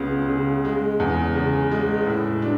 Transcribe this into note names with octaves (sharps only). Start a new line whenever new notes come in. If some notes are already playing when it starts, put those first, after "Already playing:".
Already playing: C#2 C#3 B3
C#3
G#3
E2
C#3
G#3
A2
D4